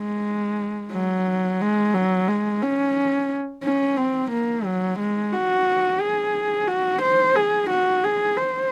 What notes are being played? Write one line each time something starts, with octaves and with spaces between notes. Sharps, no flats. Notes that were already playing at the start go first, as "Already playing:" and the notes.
Already playing: G#3
F#3
G#3
F#3
G#3
C#4
C#4
C4
A#3
F#3
G#3
F#4
G#4
F#4
C5
G#4
F#4
G#4
C5